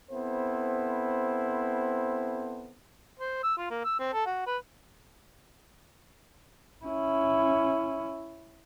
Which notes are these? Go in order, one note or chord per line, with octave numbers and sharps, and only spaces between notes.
B3 C4 E4 A4 C5
C5
E6
F4
A#3
E6
C4
A4
F#4
B4
C#4 E4